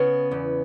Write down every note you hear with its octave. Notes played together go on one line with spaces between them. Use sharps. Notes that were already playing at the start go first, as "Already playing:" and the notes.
Already playing: C#3 B3
E2